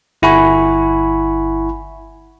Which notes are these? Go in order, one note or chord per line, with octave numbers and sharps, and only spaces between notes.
G1 E4 F#5 G#5 B5 C#6